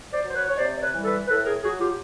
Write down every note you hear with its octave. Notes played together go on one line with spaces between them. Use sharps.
C5 D5
F#3
C5
B4 C#5
C#5
C3 C5 D5
D5
B4 C#5
E3 G3
A4 B4
A2 A4 B4
G#4 A#4
F#3 F#4 G#4
F4 G4